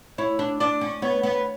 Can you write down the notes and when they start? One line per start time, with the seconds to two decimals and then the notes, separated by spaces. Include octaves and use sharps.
0.18 E4 C#5
0.39 D4
0.60 D4 D5
0.81 C#4
1.02 B3 C#5
1.23 B3